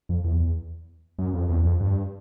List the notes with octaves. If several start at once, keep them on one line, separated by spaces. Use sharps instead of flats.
F2
E2
E2
F#2
F2
E2
F2
G2